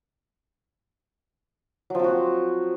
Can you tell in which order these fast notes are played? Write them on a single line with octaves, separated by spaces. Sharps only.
F#3 F3 C4 F#4